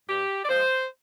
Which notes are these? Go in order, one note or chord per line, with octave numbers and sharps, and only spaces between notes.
G2 G4
D5
F3 G#3 C5